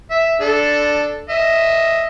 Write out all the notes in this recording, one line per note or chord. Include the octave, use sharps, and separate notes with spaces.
E5
D4 A4
D#5 E5